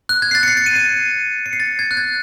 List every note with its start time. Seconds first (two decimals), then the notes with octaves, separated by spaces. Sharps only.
0.09 F#6
0.22 G#6
0.31 C7
0.35 A6
0.43 C#7
0.48 C7
0.57 C#7
0.66 D#7
0.76 C#7
1.46 C#7
1.53 C7
1.60 A6
1.79 G#6
1.91 F#6
1.97 G#6